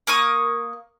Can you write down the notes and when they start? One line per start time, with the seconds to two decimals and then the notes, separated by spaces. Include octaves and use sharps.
0.07 A#3 A#4 C#6 D#6